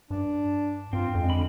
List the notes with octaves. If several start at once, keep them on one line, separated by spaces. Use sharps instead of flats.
G2 D4
G2 C4 F4
F2 G#3
D3 B5